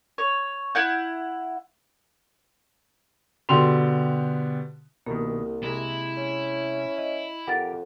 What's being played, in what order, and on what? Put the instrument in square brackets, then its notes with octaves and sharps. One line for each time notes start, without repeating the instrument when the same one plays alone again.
[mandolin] C#5
E4 F#5 G6
[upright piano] B2 D3 G4 C6 F7
[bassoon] C2 [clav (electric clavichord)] B2 D#3 [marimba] A#3
[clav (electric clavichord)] C3 G#3 A#5 [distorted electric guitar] E4
[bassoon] C#4
[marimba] D#5
[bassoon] F2 [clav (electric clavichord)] G4 A#4 [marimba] F#5 A6